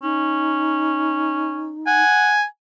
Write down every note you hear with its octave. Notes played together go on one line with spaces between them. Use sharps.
C#4 D#4
F#5 G#5